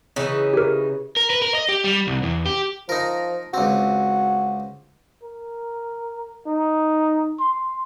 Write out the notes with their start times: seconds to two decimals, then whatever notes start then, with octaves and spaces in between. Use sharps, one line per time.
0.16 C#3 E3 D#4
0.54 G4 A#4
1.17 A#4
1.30 B4
1.42 A#4
1.55 D#5
1.69 G4
1.84 G3
2.07 C2
2.23 E2
2.46 G4
2.89 F3 D#4 A#4
3.54 C#2 C4 F#4
5.23 A#4
6.46 D#4
7.40 C6